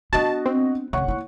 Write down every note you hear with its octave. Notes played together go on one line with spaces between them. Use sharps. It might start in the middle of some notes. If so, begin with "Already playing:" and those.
B3 D4 F#4 D#5 A5
C4
F1 C#3 C#5 F#5 C#6
A#3 E4